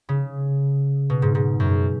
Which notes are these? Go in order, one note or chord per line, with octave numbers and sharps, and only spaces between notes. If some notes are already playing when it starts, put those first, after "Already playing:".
C#3
B2
G#2
G#2
F#2